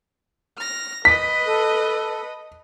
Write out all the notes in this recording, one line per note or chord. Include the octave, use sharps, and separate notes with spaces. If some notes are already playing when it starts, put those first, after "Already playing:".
F6 A#6
B4 D#5 B5 B6
A4